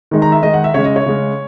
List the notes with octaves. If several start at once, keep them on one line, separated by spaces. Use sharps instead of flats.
D#3 G#3 D#4
A#5
E5
D#3 G#3 D#4 D#5
F#5
E5
C#3 G#3 C#4 C#5
D#5
C#5
C#3 G#3 C#4